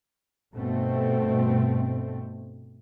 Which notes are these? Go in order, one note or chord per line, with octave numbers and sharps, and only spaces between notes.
G2 B2 A3 C4